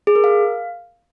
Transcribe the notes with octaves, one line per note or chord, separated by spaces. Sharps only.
G#4
A#4
F5